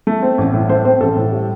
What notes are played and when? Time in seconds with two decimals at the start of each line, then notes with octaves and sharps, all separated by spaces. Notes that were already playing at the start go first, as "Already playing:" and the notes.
0.07 A3
0.23 C4
0.38 A1
0.53 A2
0.69 A3 C5
0.85 C4 C5
1.01 A1 A4
1.16 A2
1.32 G3